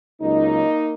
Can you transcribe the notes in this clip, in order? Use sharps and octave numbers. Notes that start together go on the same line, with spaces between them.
C#2 C#3 F#3 A#3 D#4